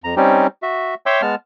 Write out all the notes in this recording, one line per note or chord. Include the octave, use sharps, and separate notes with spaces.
F2 A#5
G3 C4 C#4 D#4 G4
F#4 E5
C#5 E5 G5 C6 D6 E6
G#3 B3 A5 F6